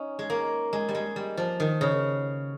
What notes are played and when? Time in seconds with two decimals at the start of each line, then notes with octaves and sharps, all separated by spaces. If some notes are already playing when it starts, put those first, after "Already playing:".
Already playing: C#4 D#4
0.19 G#3
0.30 A#3
0.73 G#3
0.89 G3
0.95 G#3
1.16 G3
1.37 F3
1.60 D#3
1.81 C#3